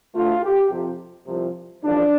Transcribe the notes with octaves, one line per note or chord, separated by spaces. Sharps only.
D2 D3 A3 F4
G4
F2 C3 F3
C2 C3 F3
A1 G2 F3 A3 D4